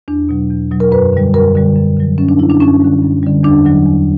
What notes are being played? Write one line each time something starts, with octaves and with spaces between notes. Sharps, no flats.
E2 D4
B2 F#3
E2
B2 F#3
A#4
F#2 B4
D3 G3
F#2 A#4
D3 G3
F#2
D3 F#3
F#2 C#4
D4
D3 F#3 E4
D4
F#2 C#4
D3 G3
F#2
D3 G3
E2 D4
D3 F#3
E2